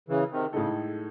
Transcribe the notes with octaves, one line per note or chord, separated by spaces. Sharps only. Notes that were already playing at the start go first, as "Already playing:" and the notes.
C#3 E3
C3 D#3
A2 C#3 G#3 D#4 A4